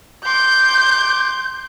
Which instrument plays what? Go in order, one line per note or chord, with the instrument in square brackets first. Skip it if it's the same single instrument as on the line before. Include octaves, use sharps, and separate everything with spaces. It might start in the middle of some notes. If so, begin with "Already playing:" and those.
[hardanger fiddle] C6 D6 [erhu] G6